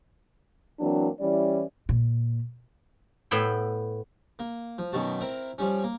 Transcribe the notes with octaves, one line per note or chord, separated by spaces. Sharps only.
E3 F#3 A#3 C4 D4
E3 G3 C#4 E4 D5
A#2
A2 B3 E5 G5
A#3
F3
F#2 B2 D#3 F#4 A5
C4 E4 A#4
F3 G3 C#4
A#3